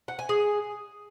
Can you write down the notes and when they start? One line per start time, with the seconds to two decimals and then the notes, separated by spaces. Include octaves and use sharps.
0.08 F#5
0.19 G#5
0.29 G#4